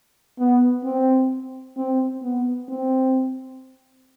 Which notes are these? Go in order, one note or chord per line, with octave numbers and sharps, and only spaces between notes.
B3
C4
C4
B3
C4